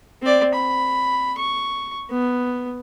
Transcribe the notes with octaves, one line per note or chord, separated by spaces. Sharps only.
C4 D5
B5
C#6
B3